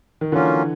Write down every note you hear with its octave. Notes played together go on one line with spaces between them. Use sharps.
D#3
D3 E3 F#3 A#3 C#4 F4